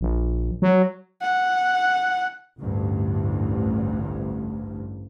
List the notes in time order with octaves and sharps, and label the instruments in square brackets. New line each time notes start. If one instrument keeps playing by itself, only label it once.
[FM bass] A#1
F#3
[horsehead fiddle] F#5
[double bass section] A1 D2 G2